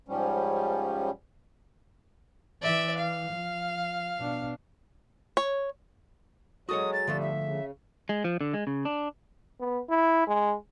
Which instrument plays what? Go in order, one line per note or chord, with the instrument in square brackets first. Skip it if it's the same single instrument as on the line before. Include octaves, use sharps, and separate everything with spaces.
[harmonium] G#2 F3 G3 C#4
[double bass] E3 [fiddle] D5 E5
[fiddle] F5
[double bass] F3
B2 D4
[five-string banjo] C#5
[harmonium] F#3 G#3 [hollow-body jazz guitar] F#4 A4 C#5 [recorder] D#6
[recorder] A6
[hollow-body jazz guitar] D3 F3 A3 [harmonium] G3
[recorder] E5
[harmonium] C#3
[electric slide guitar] G#3
F3
D3
G#3
C#3
D4
[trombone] B3
E4
G#3